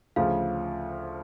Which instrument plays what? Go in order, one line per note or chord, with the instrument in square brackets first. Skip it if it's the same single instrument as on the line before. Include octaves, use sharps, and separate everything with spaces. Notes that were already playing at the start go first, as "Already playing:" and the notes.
[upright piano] D2 C#3 F3 [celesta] F5